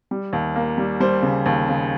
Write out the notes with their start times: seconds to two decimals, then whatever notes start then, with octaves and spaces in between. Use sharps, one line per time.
0.11 G3
0.33 D#2
0.56 A#3
0.78 G3
1.00 G3 C5
1.22 C#3
1.46 D#2
1.68 C#3